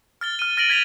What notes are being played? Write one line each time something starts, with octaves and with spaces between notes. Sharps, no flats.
F6 A6 G7
F6 D#7
F6 A6 A#6 D7 D#7 F#7
G#6 A6 B6 D#7 F7 F#7